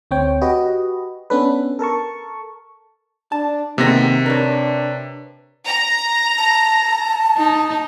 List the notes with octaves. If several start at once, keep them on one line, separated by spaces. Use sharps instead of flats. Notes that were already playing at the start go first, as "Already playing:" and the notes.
D2 C4 C#5 G5
F#4 G4 B4 D#5
B3 C#4 D4 A4 B4
A4 A#4 A5 C#6
D4 A5
C3 D#3 A#3 B3 G#4 A#6
D4 A#4 B4 C#5
A#5
A5
D#4